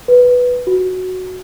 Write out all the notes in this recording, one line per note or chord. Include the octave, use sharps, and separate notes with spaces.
B4
F#4